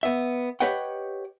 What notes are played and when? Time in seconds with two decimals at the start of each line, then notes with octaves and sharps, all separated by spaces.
0.03 B3 E5
0.60 G4 B4 C#5 D#5 F#5 G5